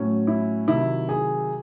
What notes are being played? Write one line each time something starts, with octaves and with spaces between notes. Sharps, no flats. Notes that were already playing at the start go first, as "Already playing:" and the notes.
Already playing: A2 F#3 C#4
E4
C3 D#3 F#3 E4
G#4